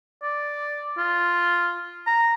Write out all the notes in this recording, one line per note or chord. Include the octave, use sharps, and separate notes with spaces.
D5
F4
A#5